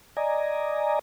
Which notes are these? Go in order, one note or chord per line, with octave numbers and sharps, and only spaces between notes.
D5 D#5 G#5 A#5